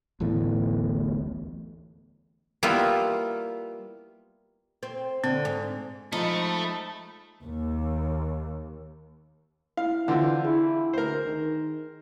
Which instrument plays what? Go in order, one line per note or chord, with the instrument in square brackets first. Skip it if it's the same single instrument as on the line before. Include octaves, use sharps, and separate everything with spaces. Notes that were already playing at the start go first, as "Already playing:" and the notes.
[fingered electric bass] D1 A1 E2 A2
[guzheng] G3 A#3 B3 E4 F4
[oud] C4
[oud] D3 [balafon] C4
[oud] G#2
[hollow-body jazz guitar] F3 G#3 [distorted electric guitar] A3 A4 [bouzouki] D#4 [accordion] A5 B5
[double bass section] D#2
[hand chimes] E4 [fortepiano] F5
[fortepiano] D3 C4 F4 [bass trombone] E3 [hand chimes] F#5
[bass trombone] E4 [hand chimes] G#4
[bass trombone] D2 [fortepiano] A#4 C5
[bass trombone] D#3